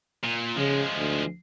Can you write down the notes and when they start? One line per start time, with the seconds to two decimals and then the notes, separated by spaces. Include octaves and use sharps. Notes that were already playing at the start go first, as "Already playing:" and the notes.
0.24 A#2
0.57 C#3 F3 G#3
0.97 D2